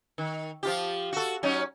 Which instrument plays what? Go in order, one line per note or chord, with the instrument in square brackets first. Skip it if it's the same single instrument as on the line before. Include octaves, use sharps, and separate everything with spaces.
[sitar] D#3
F3 F4 G4
F#4 A4
F#3 C#4 D#4